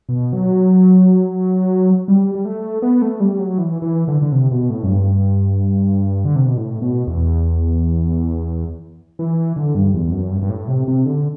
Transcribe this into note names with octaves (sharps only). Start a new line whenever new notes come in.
B2
F#3
G3
G3
A3
B3
A3
G3
F#3
E3
E3
D3
D3
C3
B2
A2
F#2
G2
D3
C3
B2
A2
B2
E2
E3
D3
G2
E2
F#2
G2
G2
A2
C3
C3
D3